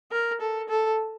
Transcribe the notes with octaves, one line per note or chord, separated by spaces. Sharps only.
A#4
A4
A4